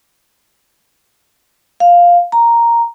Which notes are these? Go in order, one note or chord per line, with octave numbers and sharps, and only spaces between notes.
F5
A#5